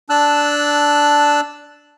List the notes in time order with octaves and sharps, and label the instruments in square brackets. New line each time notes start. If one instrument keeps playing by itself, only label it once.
[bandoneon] D4 A5 E6 F#6